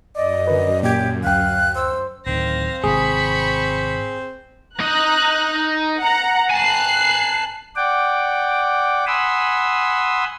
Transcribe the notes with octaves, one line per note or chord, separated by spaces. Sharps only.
F#2 D5 D#5
D3 A#4 B4 D5
A#2 G4 G#6
D2 F5 G5 F#6
C5 E6
D1 D#3 C4 F5 A#6
G#1 C3 F3 G#4 B5 C#6
D#4 D#5 A#5 F#6
F#5 A#5
G#5 A5 F#6 C7
D5 F#5 G5 D6
F#5 G#5 B5 C6 D#6 E6